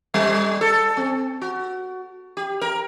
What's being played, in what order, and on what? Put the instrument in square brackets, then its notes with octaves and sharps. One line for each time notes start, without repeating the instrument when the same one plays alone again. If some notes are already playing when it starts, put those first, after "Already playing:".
[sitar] G3
A4
C4
F#4
G4
A#4